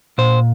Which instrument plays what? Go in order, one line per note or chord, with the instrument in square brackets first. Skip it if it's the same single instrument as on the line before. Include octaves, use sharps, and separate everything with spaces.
[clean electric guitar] A#2 C5